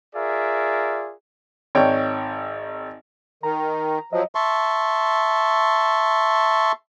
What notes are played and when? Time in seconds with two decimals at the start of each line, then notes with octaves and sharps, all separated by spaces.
0.16 F4 G#4 A#4 D5 E5
1.75 G#1 C#5 D5 G5
3.43 D#3 A#5
4.13 F3 F#3 D#5
4.35 E5 A5 C6 C#6